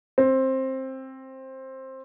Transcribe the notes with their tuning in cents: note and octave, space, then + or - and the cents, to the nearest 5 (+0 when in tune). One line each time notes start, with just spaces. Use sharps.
C4 +15